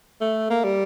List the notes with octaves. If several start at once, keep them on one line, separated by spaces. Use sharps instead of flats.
A3
A#3
G3